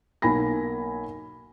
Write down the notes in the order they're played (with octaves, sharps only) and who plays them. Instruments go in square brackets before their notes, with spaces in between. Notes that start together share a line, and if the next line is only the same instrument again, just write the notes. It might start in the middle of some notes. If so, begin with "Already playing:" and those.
[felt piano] B1 A#3 G#5 B5 A#6